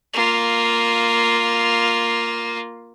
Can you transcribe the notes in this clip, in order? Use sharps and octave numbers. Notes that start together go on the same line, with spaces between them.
A#3 F4